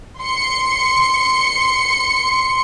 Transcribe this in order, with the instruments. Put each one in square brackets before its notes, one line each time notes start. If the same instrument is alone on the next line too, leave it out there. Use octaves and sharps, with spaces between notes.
[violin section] C6 C#7